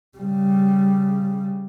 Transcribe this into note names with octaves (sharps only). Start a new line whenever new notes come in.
C#3 G3